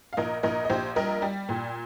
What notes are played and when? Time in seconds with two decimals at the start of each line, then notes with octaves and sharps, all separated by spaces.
0.13 F5
0.17 A#1 A#4 D#5
0.43 A#1 A#4 D#5
0.65 D#5
0.70 A#1 G4 C5
0.96 G3 A#4 D#5
1.22 G3
1.49 A#2